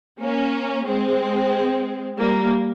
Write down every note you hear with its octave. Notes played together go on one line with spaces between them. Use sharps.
A#3 C#4
G#3 C4
G3 A#3